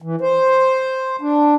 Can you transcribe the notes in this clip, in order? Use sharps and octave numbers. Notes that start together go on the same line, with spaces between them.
E3
C5
D4